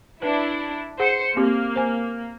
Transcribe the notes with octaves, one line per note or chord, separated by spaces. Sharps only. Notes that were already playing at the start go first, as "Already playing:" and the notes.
D4 E4 B4
G#4 C5 F#5 C#7
A#3 C4 G4
C5 G#5